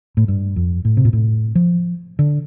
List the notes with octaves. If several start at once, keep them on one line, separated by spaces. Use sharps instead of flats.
A2
G2
F2
A2
C3
A#2
A2
F3
D3